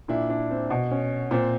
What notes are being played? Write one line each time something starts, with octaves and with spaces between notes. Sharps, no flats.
A#2 D4 E4
D4 E4
C4
B2
C#4
A#2 C4